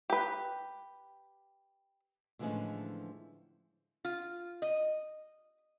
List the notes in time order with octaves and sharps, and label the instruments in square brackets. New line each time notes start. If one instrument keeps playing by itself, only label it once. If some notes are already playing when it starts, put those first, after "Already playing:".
[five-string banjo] G4 B4
[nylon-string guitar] A2 D3 E3 F3 G#3 C#4
[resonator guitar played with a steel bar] F4
D#5